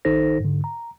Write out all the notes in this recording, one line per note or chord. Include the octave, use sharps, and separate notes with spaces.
A#1 D#3 D#4 A4 C5 A#6
G#2 D3
A#5